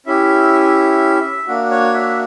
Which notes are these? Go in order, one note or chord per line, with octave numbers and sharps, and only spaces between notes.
C#4 E4 G4 E5
A#3 D4 F#4
C#5
E5